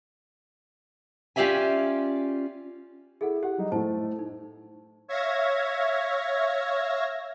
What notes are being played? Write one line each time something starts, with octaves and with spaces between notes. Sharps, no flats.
C#4 F4 G4 D5 E5 G#5
E4 G#4 A4 F#5
G4 F#5
G3 D#4
A2 A3 C5 A5
D#4
C#5 E5 F5 G#6 A#6